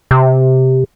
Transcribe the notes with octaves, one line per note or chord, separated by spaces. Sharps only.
C3